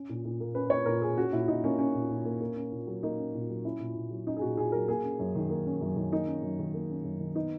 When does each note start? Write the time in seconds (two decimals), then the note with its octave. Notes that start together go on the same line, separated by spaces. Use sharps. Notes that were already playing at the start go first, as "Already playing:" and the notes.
Already playing: C#4
0.09 A#2
0.25 A#2
0.40 A#3
0.55 C#4 B4
0.70 A#2 C#5
0.86 A#2 A#4
1.02 A#3 G#4
1.17 C#4 F#4
1.32 A#2 E4
1.48 A#2 D#4
1.64 A#3 C#4
1.79 C#4
1.94 A#2
2.10 A#2
2.25 A#3
2.40 A#3
2.56 C#4
2.72 A#2
2.87 F#3
3.03 A#3 D#4
3.18 C#4
3.34 A#2
3.49 F#3
3.64 C#4 E4
3.80 A#2
3.95 A#2
4.10 F#3
4.26 C#4 D#4
4.37 G#4
4.41 A#2 F#4
4.57 A#2 G#4
4.72 F#3 A#4
4.88 A#3 G#4
5.04 C#4
5.19 F#2
5.35 D#3
5.50 A#3
5.66 C#4
5.81 F#2
5.96 D#3
6.12 A#3 D#4
6.27 C#4
6.42 F#2
6.59 D#3
6.74 A#3
6.90 C#4
7.04 F#2
7.20 D#3
7.35 B3 D#4